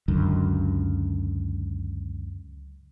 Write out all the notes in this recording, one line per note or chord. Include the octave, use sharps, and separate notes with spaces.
C#2 F#2 D3